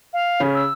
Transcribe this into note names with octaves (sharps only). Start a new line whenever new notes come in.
F5
C#3 C#4
E6